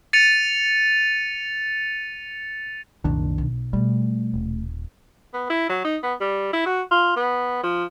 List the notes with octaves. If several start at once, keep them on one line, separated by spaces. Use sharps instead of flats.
A6 C#7 D#7 F7
C2 F#2 A#2 D#3 D4
B1
B2 G3 A3
D#1
B3
E4
F#3
D#4
B3
G3
E4
F#4
F4
B3
F3